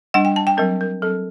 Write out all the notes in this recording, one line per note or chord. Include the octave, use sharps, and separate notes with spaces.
G3 D4 F#5
G5
A5
G5
F#3 C4 A#4
A#4
F#3 C4 A4